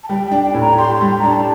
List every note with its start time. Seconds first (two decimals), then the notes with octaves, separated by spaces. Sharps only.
0.04 A5
0.09 G3 G5
0.26 G5
0.31 D4
0.43 G5
0.54 A2
0.61 A#5
0.78 G4 C6
0.95 C6
1.01 G3
1.19 D4 A#5
1.29 A5